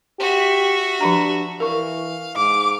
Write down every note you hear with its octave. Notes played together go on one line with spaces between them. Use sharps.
F#4 G4 E5
F3 D4 G4 A#5
E3 A#4 F5 C#6
G#2 D6